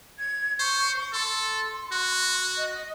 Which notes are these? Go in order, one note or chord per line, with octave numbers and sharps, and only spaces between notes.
G#6
C5 C#6
A4 C6
F#4
D#5